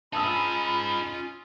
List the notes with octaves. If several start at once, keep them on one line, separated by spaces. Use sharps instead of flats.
C#4 D#4 F4 G#4 A5 B5 D#6 E6